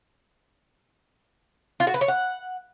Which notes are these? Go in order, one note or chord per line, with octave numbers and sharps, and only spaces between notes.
F4
F#4
B4
C#5
F#5